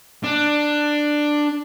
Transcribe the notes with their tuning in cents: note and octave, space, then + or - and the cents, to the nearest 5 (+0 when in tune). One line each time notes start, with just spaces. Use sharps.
D4 +10